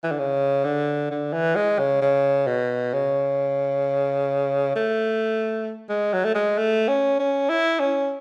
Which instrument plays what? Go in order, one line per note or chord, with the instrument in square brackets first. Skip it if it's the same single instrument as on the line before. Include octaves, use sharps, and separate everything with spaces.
[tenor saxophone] E3
D3
C#3
D3
D3
E3
G#3
C#3
C#3
B2
C#3
A3
G#3
F#3
A3
G#3
A3
C#4
C#4
E4
C#4